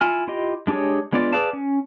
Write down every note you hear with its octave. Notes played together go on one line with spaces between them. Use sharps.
E4 F4 G#5 F6
E4 F4 G4 D#5
G#3 D4 G4 G#4 C#5
G#3 B3 D4 F4 D5
G#4 B4 D5 F5 A5
C#4